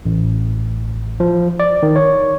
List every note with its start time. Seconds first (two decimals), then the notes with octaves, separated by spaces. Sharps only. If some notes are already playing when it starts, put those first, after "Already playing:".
0.05 A1
1.20 F3
1.60 D5
1.83 D#3
1.96 C#5